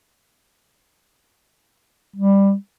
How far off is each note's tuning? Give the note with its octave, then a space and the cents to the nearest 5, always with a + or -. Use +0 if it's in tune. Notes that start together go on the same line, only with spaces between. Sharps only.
G3 +10